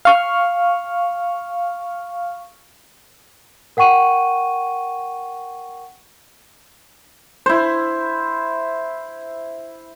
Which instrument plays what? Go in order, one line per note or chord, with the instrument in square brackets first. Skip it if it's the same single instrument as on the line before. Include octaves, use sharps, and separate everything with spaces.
[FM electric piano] F5 C#6 F6
[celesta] A#4 F#5 G5 C#6 D#7
[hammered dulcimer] E4 C5